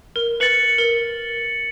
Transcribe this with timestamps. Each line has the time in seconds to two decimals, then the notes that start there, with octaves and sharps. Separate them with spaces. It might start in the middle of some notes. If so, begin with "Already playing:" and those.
0.16 A#4
0.40 B4 A6 C#7 F#7
0.78 A#4